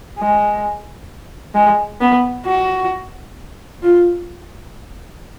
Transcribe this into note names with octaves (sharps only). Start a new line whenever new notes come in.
G#3
G#3
B3
F#4
F4